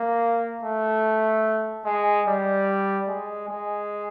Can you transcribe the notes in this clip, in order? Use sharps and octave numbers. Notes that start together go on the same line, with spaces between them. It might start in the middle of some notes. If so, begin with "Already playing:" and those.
Already playing: A#3
A3
G#3
G3
G#3
G#3